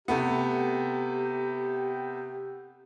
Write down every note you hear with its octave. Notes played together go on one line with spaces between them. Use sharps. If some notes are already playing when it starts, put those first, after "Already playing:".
C3 A3 B3 G4